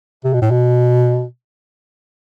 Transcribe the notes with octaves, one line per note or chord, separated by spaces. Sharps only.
C3
B2
A2
B2